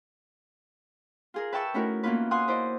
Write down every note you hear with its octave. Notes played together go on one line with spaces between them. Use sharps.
F4 G#4 A#4
B4 E5 G5 A5 C#6 E6
A3 C#4 D#4 E4 F#4 A#4
E3 A#3 B3 C#4 F4 B4
F5 F#5 G#5 C6 D#6 F#6
E4 C5 D5 D#5